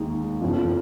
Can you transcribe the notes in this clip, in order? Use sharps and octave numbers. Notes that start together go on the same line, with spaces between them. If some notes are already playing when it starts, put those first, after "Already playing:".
Already playing: D#2 D#3 G#3 D#4
F#1 F2 F3 B3